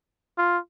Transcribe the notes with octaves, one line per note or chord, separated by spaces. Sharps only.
F4